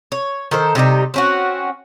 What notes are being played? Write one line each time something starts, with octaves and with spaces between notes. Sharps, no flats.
C#5
D#3 A4 C5
C3 G3 D#4 G4
C4 C#4 F#4